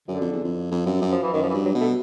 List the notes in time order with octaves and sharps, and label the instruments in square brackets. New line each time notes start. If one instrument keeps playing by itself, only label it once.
[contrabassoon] F#2 [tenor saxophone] D3
[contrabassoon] F2
E2
F2
F2
F#2
F#2
[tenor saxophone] F3
E3
[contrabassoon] F#2 [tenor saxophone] D#3
[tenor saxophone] F3
E3
[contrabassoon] G2
[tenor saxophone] F#3
[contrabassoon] B2
[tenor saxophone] A3